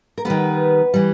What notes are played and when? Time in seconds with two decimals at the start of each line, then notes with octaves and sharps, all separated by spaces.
0.18 A#4
0.25 D#3 G3 B3 B4
0.94 E3 G3